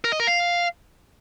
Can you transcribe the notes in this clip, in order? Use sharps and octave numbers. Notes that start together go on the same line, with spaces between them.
A#4
D#5
A#4
F5